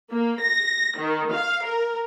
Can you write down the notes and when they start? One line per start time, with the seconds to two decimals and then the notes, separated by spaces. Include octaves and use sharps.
0.11 A#3
0.40 A#6
0.98 D#3
1.34 F5
1.65 A#4